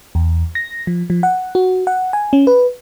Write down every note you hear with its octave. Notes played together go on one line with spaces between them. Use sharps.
E2
A#6
F3
F3
F#5
F#4
F#5
G#5
C#4
B4